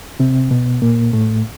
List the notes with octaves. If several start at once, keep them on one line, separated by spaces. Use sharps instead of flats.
C3 C4
B2 B3
A#2 A#3
A2 A3